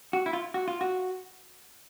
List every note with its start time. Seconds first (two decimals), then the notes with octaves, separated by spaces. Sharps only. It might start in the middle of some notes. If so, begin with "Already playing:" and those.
0.13 F#4
0.26 E4
0.33 F4
0.54 F#4
0.68 F4
0.81 F#4